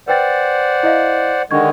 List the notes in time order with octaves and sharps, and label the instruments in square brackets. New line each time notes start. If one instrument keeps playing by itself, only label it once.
[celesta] B4 G5 A6 [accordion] C5 D5 F#5
[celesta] E4 D#5 F5
[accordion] D3 D#3 G#3 [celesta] D4 C#6 G#6